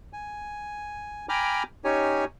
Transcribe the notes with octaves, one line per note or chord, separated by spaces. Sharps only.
G#5
G5 G#5 A#5 B5 D6 F6
C#4 D#4 G4 C#5 G#5